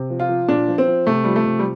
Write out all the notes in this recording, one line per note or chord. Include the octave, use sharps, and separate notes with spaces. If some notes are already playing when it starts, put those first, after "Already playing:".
Already playing: C3
F3
F4
F3
A#2 D4
F3
C4
F3
C3 A3
F3 G3
A3
C3
G3